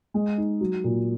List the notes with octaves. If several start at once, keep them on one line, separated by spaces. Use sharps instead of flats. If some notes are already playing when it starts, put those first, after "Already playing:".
G#3
D#4
F#3
A#2